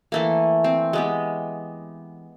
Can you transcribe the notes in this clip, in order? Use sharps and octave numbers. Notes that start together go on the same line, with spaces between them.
E3 A3 A#3
C4
G#3 B3 G4